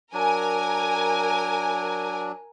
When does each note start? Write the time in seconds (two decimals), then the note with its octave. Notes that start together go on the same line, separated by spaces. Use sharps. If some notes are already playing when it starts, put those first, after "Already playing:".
0.13 F#3 D4 A#4 G#5